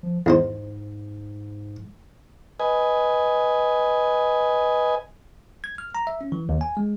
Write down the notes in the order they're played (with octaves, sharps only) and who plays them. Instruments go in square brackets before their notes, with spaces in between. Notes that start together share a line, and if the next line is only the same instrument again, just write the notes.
[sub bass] F3
[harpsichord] E2 D#4 C5 [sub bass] G#2
[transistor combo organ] B4 D#5 G#5
[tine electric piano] G#6
F6
A#5
E5
C#4
E3
D#2
G#5
G#3